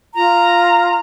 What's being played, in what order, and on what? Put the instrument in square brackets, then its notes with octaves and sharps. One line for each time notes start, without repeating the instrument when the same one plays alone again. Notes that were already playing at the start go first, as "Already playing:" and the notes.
[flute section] F4 A#5